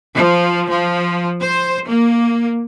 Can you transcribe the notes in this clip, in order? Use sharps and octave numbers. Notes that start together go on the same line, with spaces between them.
F3
F3
C5
A#3